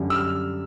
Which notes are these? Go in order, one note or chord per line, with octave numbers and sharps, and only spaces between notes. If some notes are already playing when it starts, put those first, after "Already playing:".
Already playing: F#2 D3 G3
E6
F6